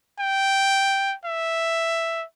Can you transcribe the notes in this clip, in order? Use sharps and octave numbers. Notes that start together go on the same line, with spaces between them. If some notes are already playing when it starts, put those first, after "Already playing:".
G5
E5